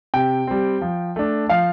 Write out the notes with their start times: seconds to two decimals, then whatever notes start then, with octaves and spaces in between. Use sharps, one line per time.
0.14 C3 G5
0.47 G3 C4
0.81 F3
1.16 A3 D4
1.49 F3 F5